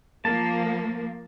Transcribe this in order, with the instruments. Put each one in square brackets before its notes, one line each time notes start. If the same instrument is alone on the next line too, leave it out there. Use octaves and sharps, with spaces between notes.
[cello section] F3 A#3 [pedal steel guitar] A5